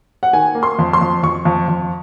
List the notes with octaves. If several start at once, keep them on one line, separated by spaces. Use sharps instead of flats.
F#5
D#3 G#5
A#3
C6
F2
C6
F2
F2 C#6
F2
F2